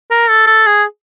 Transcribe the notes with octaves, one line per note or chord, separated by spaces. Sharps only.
A#4
A4
A4
G#4